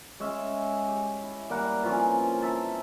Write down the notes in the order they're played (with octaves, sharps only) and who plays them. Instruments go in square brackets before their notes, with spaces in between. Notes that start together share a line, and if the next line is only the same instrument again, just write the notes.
[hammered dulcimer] G#3 C#4 E5
G4
E4
G3 A#3 A#4 F#5
E3 F3 C4 C#4
E5 A5